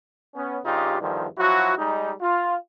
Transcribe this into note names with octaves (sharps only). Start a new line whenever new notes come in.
B3 C#4
G2 C#3 D#4 F4 G4
E2 G2 D3 D#3 F3
F3 F#3 E4 F#4
G3 G#3 D#4
F4